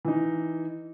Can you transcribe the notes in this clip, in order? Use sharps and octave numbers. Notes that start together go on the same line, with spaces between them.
E3 D#4